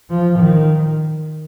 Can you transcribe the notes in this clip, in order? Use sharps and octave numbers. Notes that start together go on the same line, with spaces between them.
F3
D#3